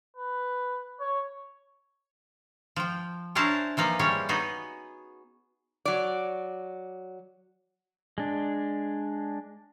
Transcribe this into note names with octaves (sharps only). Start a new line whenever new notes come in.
B4
C#5
F3 G5
C#4 D4 E4 C5 A5 A#5
E3 F3 A#3 D#4
G3 G#3 C#4 C#5
B3 D#4 F#4 G#4
F#3 D5
G#3 D4